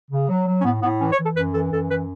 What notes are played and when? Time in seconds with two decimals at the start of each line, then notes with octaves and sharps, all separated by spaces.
0.11 C#3
0.28 F#3
0.47 F#3
0.59 C#4
0.64 A2 B3
0.82 A2 B3
0.99 E3 C#4
1.12 C#5
1.18 E3
1.24 A4
1.36 F#2 B4
1.54 E3 A4
1.72 F#2 A4
1.90 E3 B4